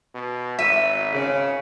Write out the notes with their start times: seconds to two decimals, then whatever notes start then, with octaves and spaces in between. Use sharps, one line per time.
0.15 B2
0.59 G#1 E5 B6 D#7
1.12 C#3